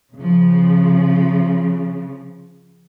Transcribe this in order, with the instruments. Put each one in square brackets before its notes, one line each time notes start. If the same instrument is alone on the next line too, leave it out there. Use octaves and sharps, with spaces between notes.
[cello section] C#3 F3